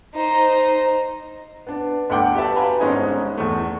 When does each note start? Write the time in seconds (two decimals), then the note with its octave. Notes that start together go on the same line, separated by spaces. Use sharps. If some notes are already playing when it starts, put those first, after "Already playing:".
0.14 D#4 C5
1.67 B3 D4
2.10 G1 D2 D4 F#5 G5 D6
2.35 F#4 G4 A4 B4 E5 A5
2.56 B4 F5 G#5 A#5 B5
2.80 G1 G#2 C4 C#4 D#4 G#4
3.37 E2 A3